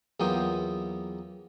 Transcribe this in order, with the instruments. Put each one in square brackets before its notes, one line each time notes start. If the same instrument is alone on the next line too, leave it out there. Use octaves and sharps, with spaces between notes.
[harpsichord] E2 F#3 A#3 F4 G5 D#6